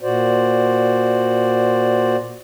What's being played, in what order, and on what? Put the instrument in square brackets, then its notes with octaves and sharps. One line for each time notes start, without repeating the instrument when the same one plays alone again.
[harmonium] A#2 F#4 C5 D5